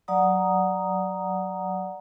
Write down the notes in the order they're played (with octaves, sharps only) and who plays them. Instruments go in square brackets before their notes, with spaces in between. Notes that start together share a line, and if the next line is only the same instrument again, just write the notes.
[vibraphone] F#3 D5 F#5 A#5 D#6